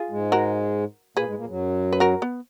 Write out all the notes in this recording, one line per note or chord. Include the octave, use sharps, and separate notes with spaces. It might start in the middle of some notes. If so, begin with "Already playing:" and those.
Already playing: F4 G#4
G#2 G#3
F#4 A#4
A#2 A#3 G#4 B4
G#2 G#3
A#2 A#3
F#2 F#3
B4
F#4 A#4
B3